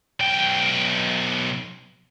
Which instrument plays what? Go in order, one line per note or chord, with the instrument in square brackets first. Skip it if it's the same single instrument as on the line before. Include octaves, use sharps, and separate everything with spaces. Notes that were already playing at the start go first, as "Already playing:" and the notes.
[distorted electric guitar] B1 G5